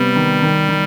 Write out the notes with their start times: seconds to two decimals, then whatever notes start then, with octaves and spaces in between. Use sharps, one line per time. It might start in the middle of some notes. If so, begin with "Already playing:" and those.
Already playing: C3 G3 B3
0.16 D#3
0.42 D#3
0.69 D#3